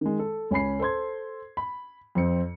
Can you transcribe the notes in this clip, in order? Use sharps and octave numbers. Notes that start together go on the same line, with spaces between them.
D#3 G#3
A4
C#2 C#4 G#5 B5 C7
A4 C5 C6 G#6
B5
F2 C4 C#7